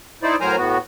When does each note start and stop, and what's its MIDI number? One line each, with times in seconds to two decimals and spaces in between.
0.23 0.36 63
0.23 0.36 64
0.23 0.36 72
0.23 0.36 74
0.41 0.56 45
0.41 0.56 54
0.41 0.56 70
0.41 0.56 72
0.41 0.56 80
0.41 0.56 82
0.57 0.78 45
0.57 0.78 59
0.57 0.78 66